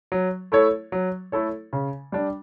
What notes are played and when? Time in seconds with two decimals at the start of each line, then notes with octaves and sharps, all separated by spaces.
0.12 F#3
0.52 A3 E4 A4 C#5
0.92 F#3
1.32 A3 E4 A4 C#5
1.73 C#3
2.12 G3 D4